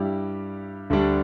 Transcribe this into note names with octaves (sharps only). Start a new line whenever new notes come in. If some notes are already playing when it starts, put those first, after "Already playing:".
Already playing: G2 G3 E4 G4
D2 D3 G3 D4